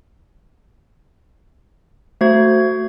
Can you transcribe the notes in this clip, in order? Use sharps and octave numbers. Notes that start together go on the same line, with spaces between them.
A3 F#4 C5 G#6